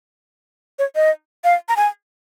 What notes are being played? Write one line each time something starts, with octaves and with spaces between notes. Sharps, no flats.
C#5
D#5
F5
A#5
G#5